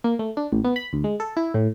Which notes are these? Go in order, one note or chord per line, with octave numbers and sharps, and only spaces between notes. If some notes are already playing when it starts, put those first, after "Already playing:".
A#3
A3
D4
A1
B3
B5
D2
G#3
A4
E4
A2